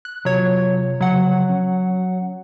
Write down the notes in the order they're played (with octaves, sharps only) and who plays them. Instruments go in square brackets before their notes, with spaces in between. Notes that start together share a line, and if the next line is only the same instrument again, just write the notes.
[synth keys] F#6
[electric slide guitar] C3 F4 G#4 [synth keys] F#3 C#5
[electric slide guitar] C#3 F3 E5 [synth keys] F#3 F#5
[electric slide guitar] C#4